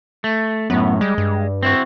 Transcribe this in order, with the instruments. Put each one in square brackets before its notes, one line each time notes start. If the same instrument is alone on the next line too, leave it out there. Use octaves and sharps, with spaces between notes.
[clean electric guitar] A3
[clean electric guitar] F#2 A2 [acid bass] B3
[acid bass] G3 [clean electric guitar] G#3
[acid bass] G2
[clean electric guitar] C4 E4 F#4